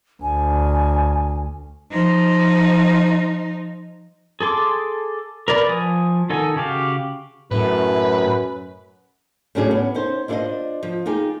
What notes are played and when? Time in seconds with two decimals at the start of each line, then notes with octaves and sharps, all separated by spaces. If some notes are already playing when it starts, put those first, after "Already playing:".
0.22 D2 G#5
1.91 F3 D#4
4.41 G#4 A4 C6 D6
5.48 A#4 B4 D5 B5
5.68 F3 G#5 D#6
6.30 D#3 D#4 A4 F#5 G#5
6.56 C#3 F#4 G4 F5
7.51 F#2 A2 B4
9.55 A2 F#3 C#4 D4 G#4
9.71 B3
9.95 C#4 D#4 C5
10.28 D4 E4 F4 A4 C5 D#5
10.83 F3
11.06 D#4 F4 G4 G#4